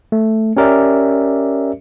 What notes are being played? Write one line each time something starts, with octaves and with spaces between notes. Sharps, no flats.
A3
C#4 G4 A#4 D5 E5